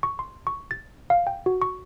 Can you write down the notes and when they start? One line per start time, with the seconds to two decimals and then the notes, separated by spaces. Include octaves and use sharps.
0.03 C#6
0.19 C6
0.47 C#6
0.71 A6
1.10 F5
1.27 G5
1.46 F#4
1.62 C#6